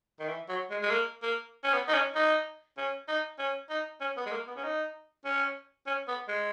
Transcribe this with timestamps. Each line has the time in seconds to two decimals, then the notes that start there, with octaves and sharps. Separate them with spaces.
0.19 D#3
0.29 E3
0.49 F#3
0.70 G#3
0.82 G#3
0.90 A#3
1.22 A#3
1.64 C#4
1.73 B3
1.88 D#4
1.94 C#4
2.15 D#4
2.77 C#4
3.08 D#4
3.38 C#4
3.69 D#4
4.01 C#4
4.17 B3
4.26 G#3
4.31 A#3
4.47 B3
4.56 C#4
4.63 D#4
5.25 C#4
5.86 C#4
6.08 B3
6.28 G#3